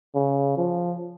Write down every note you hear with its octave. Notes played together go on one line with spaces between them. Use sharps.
C#3
F3